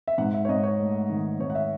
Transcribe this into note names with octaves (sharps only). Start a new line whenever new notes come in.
E5
G#2 F#5
E5
C#5
G#2 D#5
C#5
A3
D#3
G#2 C#5
F#5
E5